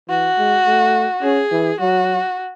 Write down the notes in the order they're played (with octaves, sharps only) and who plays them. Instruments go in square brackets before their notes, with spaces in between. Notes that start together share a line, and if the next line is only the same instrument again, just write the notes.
[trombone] E3 [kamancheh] F#4
[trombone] G#3
A3
[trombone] C#4 [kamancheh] G#4
[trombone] E3
[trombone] F#3 [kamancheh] F#4